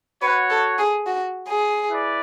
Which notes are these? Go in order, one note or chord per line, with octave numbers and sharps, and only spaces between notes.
F#4 B4 C#5 F#5
A4
G#4
F#4
G#4
E4 B4 D5